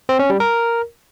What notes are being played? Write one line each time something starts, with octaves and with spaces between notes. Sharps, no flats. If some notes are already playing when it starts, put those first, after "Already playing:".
C4
C#4
G3
A#4